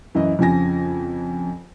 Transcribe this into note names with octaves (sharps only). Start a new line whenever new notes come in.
F#2 E3 D#5
F2 C#3 F3 G#5 A#6